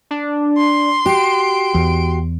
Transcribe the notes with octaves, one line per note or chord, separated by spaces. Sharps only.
D4
C6
F#4 G4 D7
E2